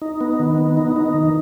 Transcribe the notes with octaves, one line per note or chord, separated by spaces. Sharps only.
D#4
B3
D#3
B3
D#4
D#4
D#3